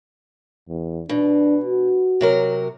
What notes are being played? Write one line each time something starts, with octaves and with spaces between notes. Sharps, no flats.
E2
B2 D4
F#4
C3 F#3 A#4